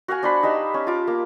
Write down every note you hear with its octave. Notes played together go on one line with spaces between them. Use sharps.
F#4 F5 F#5 G#5
D4 C5 B5
D#4 G4 A5
C#4
F4 D6
A#3